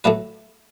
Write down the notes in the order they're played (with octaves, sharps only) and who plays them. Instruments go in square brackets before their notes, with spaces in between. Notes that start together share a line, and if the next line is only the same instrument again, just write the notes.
[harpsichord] A2 F#3 A3 B4